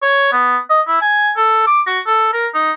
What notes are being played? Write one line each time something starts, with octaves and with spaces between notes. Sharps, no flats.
C#5
B3
D#5
E4
G#5
A4
D6
F#4
A4
A#4
D#4